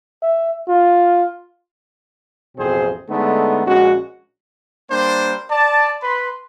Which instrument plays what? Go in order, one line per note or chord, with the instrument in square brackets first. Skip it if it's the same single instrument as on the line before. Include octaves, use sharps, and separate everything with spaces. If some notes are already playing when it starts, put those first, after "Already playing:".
[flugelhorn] E5
F4
[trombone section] A1 F2 B2 C4 G#4 C5
D3 G#3 A3 B3 D#4
A#1 G#3 C#4 F#4
[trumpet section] G3 A#3 D4 C5
D5 A5
B4 B5 C6